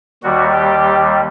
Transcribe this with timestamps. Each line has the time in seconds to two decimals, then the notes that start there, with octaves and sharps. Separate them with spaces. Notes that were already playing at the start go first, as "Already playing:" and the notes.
0.23 D#2 D#3 G3 F#4
0.53 G4